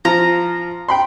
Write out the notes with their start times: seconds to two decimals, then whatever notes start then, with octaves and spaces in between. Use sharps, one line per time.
0.05 F3 F4 A#5
0.89 G5 B5 C6